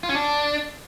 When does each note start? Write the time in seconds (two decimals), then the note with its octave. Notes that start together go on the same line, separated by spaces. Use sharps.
0.03 F4
0.09 C#4
0.15 D4